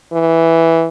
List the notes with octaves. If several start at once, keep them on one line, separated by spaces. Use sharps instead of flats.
E3